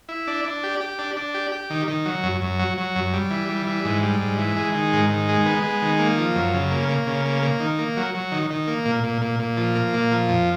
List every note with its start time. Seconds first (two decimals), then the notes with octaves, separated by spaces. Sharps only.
0.09 E4
0.27 D4
0.45 D4
0.63 G4
0.81 G4
0.99 D4
1.17 D4
1.34 G4
1.52 G4
1.70 D#3
1.88 D#3
2.06 F#3
2.23 F#2
2.41 F#2
2.59 F#3
2.78 F#3
2.95 F#2
3.13 G3
3.31 E3
3.49 G3
3.67 E3
3.85 G#2
4.03 G3
4.21 G#2
4.38 E3
4.56 G#3
4.74 D#3
4.93 G#2
5.10 D#3
5.29 G#3
5.46 B3
5.63 G#3
5.82 D#3
5.99 A#3
6.18 F3
6.35 F#2
6.54 C#3
6.71 A#3
6.89 A#3
7.07 C#3
7.25 A#3
7.42 A#3
7.60 D#3
7.79 A#3
7.97 F#3
8.15 F#3
8.32 D#3
8.50 D#3
8.67 A#3
8.85 A#2
9.04 A#2
9.22 A#2
9.40 A#2
9.57 F3
9.75 A#3
9.94 A#2
10.12 F3
10.29 F2